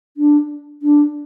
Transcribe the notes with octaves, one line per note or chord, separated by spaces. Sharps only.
D4
D4